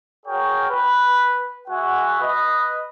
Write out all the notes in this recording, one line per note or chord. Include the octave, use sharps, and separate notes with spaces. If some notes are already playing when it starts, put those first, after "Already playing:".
F#4 G#4 A#4 C#5 G5
B4
G#3 F#4 E5 F#5 G#5
B4 D#5